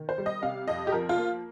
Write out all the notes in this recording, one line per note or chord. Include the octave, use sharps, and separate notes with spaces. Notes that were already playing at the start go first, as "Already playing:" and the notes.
Already playing: D#3
C5
G3
D#5
C3 F5
F2 D#5
G4
F3 A#4
F4
A#3